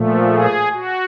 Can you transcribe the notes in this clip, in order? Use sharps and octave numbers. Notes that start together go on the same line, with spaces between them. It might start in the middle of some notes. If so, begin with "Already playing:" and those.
Already playing: A#2 F3 A3
G#4
F#4